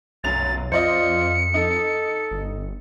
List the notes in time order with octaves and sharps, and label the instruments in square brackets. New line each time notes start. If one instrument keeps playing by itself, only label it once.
[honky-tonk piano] F1 F#2 F7 [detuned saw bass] B1 [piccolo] A6
[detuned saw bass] F2 [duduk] F4 [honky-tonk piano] C5 D5 D#5 [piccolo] C#7
[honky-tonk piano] D#4 [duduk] A4
[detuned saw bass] G1